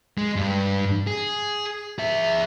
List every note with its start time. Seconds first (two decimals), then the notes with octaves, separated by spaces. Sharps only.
0.18 G#3
0.36 G2
1.07 G#4
1.99 G#4 E5